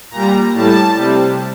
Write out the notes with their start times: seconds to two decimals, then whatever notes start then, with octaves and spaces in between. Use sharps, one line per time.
0.11 A#2 G3 A#5
0.52 A2 G3 A5
0.94 C3 G3